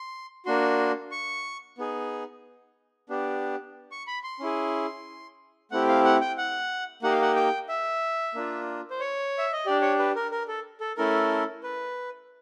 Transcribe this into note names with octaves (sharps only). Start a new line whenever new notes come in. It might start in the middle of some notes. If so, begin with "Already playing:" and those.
Already playing: C6
A#3 D4 F#4 C6
C#6
B3 D#4 G#4
B3 D4 G4
C#6
B5
C6
C#4 E4 G#4
A3 C4 E4 G4 F#5
F5
F#5
G5
F#5
A#3 D#4 G4 F#5
F5
F#5
G5
E5
A#3 D4 F4
C5
C#5
E5
D#5
D4 G4 D5
C#5
B4
A#4
A#4
A4
A4
A3 C#4 E4 A4 A#4
B4